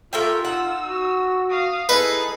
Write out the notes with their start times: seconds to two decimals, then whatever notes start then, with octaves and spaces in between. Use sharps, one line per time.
0.13 A3 F4 G4 A#4 E5 G5
0.45 D#4 F#5 E6
0.86 F#4
1.50 F5 D#6
1.89 D#4 E4 G#4 A4 B4